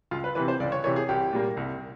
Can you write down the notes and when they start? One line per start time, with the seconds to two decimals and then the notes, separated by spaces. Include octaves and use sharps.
0.11 C#2 F4
0.24 B4
0.35 C3 E3 B4
0.48 C5
0.60 C#2 D5
0.72 C#5
0.84 C3 E3 C#5
0.96 G#4
1.09 C2 G4
1.33 A#2 G3 A#3
1.57 C2